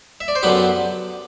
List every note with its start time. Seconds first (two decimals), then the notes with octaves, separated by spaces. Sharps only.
0.21 E5
0.28 D5
0.35 C5
0.43 F#2 D3 F#3 B3 G4 B4